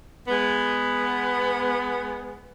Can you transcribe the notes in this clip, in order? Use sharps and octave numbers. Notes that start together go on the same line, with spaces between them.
G#3 B3